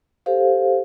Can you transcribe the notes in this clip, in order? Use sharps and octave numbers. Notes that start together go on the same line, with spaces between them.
G4 A4 C5 F5